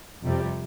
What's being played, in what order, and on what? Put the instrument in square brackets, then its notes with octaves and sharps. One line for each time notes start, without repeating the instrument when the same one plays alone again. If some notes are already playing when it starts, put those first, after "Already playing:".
[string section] F2 C3 G3